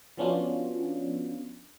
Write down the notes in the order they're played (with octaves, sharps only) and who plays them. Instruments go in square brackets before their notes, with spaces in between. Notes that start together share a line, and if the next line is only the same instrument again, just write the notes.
[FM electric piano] F3 B3 C#4 D4 F4 F#4